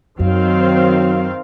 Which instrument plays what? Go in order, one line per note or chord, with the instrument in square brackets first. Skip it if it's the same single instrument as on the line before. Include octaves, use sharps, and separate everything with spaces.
[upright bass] F#2 [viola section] D#3 C4 F5 [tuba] F#3